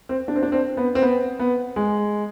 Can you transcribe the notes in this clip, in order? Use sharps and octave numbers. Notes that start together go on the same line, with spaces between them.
C4
D4
C4
D4
C4
B3
C4
B3
B3
G#3